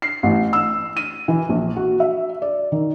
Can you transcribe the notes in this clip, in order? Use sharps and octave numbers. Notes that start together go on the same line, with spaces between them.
C7
A1
E6
D#7
E3
A#1
F#4
E5
D5
D#3